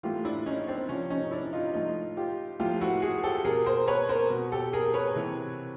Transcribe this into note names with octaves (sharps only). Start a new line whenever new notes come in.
A2 E3 F4 G4
D4 E4
C#4 D#4
C4 D4
C3 F3 C#4
C#4 D#4
D4 E4
D#4 F4
A2 F3 D#4 F4
F4 G4
A2 F3 F4 G4
E4 F#4
F#4 G#4
G4 A4
B2 G#4 A#4
A#4 C5
B4 C#5
A#4 C5
B2
G4 A4
G#4 A#4
B4 C#5
C3 E3